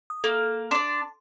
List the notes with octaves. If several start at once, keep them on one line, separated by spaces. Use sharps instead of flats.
D#6
A#3 A4
D4 D5 C6